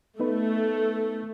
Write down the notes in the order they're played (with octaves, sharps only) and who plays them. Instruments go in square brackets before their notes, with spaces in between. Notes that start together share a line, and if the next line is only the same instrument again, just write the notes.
[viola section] A3 [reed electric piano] B3 D#4 B4